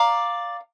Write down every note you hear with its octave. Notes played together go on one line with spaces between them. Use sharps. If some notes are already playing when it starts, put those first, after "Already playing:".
Already playing: D5 F5 A#5